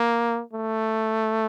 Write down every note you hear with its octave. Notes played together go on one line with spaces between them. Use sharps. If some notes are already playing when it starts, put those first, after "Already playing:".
Already playing: A#3
A3